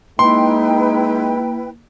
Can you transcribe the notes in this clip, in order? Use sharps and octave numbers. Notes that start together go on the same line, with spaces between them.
G#3 A#3 D#4 E4 B4 G5 C6